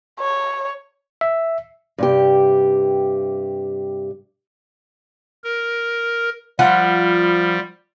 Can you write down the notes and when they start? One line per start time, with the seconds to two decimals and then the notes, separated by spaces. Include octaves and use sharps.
0.20 C#5
1.21 E5
1.98 G2 C3 G4
5.44 A#4
6.59 F3 G3 F4 F#5